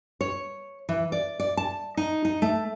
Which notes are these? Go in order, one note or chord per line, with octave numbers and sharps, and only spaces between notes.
C#5
E3
D5
D5
A5
D#4
D#4
A3